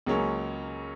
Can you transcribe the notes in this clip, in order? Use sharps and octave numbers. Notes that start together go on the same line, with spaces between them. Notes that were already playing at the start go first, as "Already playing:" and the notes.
C#2 C#3 F#3 A#3 C#4